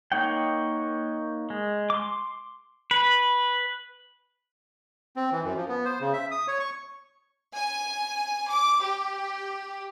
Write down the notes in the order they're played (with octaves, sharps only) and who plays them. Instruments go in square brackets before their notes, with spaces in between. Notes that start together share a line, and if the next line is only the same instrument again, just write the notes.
[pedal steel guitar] A#3 D#4 C#5 F#5 G5
G#3
C6 D6
B4
[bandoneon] C4
E3
F#2
F3
B3
C5
C#3
E5
D#6
C#5
C#6
[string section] G#5
D6
G4